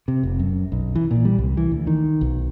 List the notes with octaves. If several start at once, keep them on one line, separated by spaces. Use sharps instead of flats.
C3
F1
F#2
B1
E3
A#2
G3
C2
E3
D2
D#3
B1